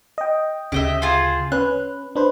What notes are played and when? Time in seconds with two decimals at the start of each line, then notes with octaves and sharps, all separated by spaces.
0.18 D#5 G5
0.72 D2 C#3 G4 D#5 E5
1.02 F4 G#4 C5
1.52 C#4 B4 F#6
2.16 D4 B4 C5